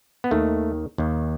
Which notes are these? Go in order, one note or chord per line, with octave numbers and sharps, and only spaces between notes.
B3
D#2 D#3 A3
D#2 D#3